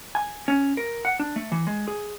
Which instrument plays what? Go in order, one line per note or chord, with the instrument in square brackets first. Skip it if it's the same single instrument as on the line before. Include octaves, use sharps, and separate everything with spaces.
[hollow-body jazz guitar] G#5
C#4
A#4
F#5
D4
A3
E3
G#3
G#4